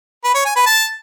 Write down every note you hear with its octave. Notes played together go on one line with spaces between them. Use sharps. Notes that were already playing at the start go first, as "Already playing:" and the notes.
B4
C#5
G#5
B4
A5